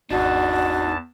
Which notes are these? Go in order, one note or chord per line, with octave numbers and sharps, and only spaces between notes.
G#1 E2 D4 D#4 F#4 A5